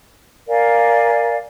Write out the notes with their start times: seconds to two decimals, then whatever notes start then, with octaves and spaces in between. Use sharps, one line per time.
0.45 A#4 D5 F5 G#5